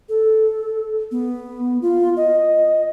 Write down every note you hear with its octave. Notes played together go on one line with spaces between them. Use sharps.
A4
B3
F4
D#5